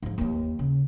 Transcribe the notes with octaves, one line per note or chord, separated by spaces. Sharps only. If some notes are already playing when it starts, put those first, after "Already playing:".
G#2 F3
D#2 E3
C#3